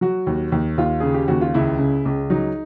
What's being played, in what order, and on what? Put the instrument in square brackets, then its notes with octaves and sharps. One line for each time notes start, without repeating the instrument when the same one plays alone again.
[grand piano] F#3 F#4
D#2
D#2
D#2 F4
C#3 G#4
G4
D#2 F#4
F4
C#2 E4
C#3
C#2
F#3 D#4